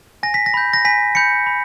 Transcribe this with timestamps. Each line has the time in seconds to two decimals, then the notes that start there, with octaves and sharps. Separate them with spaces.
0.23 G#5 A#6
0.34 B6
0.46 A#6
0.54 B5 G6
0.73 A#6
0.85 G#5 B6
1.15 B5 G6 C#7
1.46 B5